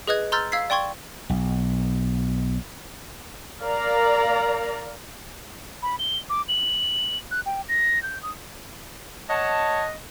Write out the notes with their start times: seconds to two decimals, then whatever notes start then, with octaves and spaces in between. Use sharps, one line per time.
0.07 G#4 B4 D#5 D#6 F#6 G#6
0.32 A#5 C6 E6 F6 G6 A6
0.52 F5 E6 G#6 B6 C7
0.70 D5 G5 C6 C#6 G#6
1.30 B1
3.61 A#4 D5 F5 A#5
5.83 B5
5.99 G7
6.30 D6
6.49 F#7
7.31 F#6
7.46 G5
7.68 A#6
8.03 G6
8.23 D#6
9.29 C#5 D#5 F#5 A5